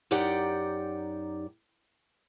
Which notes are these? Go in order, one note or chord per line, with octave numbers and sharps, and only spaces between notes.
F#2 D#4 G4 D5 F#5 G5